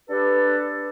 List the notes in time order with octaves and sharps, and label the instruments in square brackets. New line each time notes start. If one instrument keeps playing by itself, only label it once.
[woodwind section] D4 G4 A4 B4